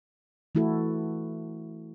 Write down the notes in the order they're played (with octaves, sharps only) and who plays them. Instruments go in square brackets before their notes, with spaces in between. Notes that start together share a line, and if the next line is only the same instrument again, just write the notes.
[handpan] E3 A3 E4 F#4 A4